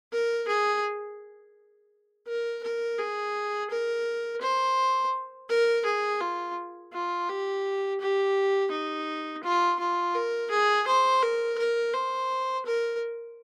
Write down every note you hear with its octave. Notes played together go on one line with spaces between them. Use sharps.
A#4
G#4
A#4
A#4
G#4
A#4
C5
A#4
G#4
F4
F4
G4
G4
D#4
F4
F4
A#4
G#4
C5
A#4
A#4
C5
A#4